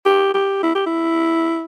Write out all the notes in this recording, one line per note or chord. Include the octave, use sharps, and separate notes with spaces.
G4
G4
E4
G4
E4